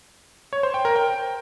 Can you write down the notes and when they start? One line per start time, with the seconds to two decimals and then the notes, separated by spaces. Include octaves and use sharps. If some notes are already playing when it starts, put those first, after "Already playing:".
0.53 C#5
0.63 C5
0.74 G5
0.85 A#4
0.96 G5